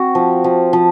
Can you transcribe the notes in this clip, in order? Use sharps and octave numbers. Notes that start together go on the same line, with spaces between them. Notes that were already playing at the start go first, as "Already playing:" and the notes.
Already playing: C4 F#4
F3
F3
F3